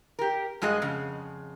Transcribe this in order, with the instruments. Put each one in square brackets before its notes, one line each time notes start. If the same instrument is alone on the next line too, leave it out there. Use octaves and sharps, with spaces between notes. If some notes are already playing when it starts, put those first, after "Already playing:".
[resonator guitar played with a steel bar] G4 A#4
G2 G#3 F#4 G#4 D#5
F2 C#3